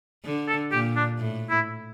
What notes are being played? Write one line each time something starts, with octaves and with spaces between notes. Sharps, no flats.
D3
A4
A#2 G4
D4
A2
E4